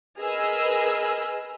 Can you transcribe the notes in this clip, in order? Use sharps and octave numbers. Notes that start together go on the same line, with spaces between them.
G#4 A#4 B4 D#5 E6 F6